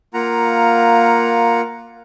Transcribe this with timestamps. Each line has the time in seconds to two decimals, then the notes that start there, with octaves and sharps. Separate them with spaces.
0.14 A#3 F4 F#5 A#5